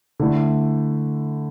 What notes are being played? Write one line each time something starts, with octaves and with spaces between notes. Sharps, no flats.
D3 A3 E4